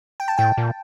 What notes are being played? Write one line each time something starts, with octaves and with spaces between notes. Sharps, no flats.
G5
A5
A2 G5
A#2